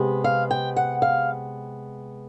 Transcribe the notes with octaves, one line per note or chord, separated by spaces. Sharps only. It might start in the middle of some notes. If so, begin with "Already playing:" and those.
Already playing: C3 G#3 B3
F5
G5
F#5
F5